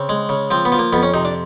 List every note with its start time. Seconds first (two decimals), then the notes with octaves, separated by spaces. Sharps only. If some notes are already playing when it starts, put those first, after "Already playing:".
Already playing: C#3 C4
0.09 G#3
0.29 C#3
0.51 F3 C4
0.65 B3
0.72 F3
0.79 A#3
0.93 F2 B3
1.03 C#4
1.14 C3 D#4
1.25 D4